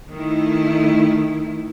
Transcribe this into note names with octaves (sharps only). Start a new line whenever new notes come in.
D#3 A3 E4